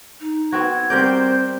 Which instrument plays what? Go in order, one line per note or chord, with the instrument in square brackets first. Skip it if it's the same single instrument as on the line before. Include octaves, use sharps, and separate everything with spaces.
[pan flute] D#4
[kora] B3 C4 F#4 [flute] G#6
[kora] G3 A#4 D5 [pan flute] C4 [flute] C5 [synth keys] G6